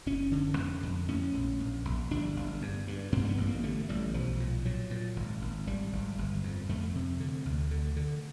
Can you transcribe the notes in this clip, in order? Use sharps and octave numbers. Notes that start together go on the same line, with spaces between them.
F#1 C#4
D3
F2
F2
A2 C#4
A#1
A#1
A#1
G1 D4
G1
G2
G2
G2 C4
C4
B3
A1
A#3
D3 A3
A1 G3
B1 F3
A#2
A#2 F#3
A#2
G#1
G#1
G#1 G3
G#1
G1
F2
F2 A3
C3
D3
D2
D3
D3